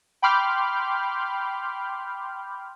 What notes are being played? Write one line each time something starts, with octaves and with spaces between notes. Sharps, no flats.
G5 B5 C6 D6 F6 G6